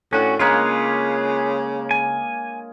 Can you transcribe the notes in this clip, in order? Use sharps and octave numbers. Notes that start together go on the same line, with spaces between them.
A2 C#4 D4 F#4
C#3 G#3 A#3 F4 G#4 B4 C#5
G#5